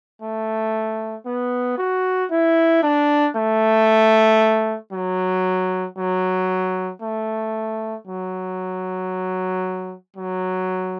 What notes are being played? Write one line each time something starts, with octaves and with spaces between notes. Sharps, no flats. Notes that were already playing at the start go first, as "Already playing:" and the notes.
A3
B3
F#4
E4
D4
A3
F#3
F#3
A3
F#3
F#3